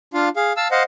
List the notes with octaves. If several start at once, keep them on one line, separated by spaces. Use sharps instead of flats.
D4 F4 F5
G#4 F5
F5 A5 E6
C5 D#5 F5 F#5